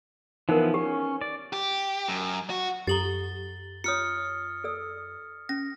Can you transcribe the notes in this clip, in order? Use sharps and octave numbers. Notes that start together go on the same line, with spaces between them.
E3 F3 B3 D#4 A#4
C#4 G4
D5
G4
F#2
F#4
F#2 G4 A4 A#5 A6 F#7 G7
F4 C#5 D#6 F6 C#7
A4 D5 E6
C#4 A#6